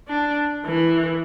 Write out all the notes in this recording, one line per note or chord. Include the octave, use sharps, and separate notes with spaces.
D4
E3